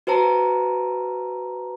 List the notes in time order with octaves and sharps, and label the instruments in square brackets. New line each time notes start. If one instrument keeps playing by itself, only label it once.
[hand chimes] F#4 B4 C5 A5 A#5